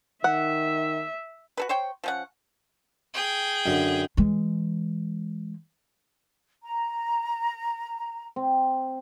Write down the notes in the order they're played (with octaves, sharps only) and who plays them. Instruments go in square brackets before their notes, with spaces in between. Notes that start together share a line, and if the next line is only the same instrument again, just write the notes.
[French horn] D#3 [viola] E5 [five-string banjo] F#5
[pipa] F#4 A4 B4
C5 C#5 G5
F3 C#4 F#5
[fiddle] G#4 G5
[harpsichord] F#2 D3
[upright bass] E3 G#3
[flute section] A#5
[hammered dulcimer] C4